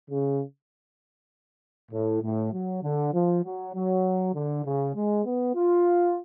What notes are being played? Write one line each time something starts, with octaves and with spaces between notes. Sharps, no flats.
C#3
A2
A2
F#3
D3
F3
F#3
F#3
D3
C#3
G#3
B3
F4